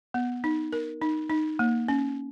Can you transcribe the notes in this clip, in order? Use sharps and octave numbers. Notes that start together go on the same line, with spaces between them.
B3
D#4
A#4
D#4
D#4
A#3
C#4